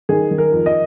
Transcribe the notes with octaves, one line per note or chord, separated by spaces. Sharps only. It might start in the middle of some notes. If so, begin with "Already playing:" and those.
D#3 G#4
D#3
A#4
F2
D#5